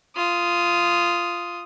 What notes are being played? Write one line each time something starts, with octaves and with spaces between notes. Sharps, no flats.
F4 D#6